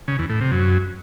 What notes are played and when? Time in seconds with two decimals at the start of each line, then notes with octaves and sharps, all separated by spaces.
0.08 C#3
0.19 E2
0.30 A2
0.41 C3
0.51 F#2